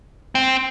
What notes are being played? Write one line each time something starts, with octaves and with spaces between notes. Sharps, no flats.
C4